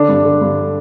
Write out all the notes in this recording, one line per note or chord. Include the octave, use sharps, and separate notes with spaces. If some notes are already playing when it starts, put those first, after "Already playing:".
Already playing: D3 D4
G2
D3
G2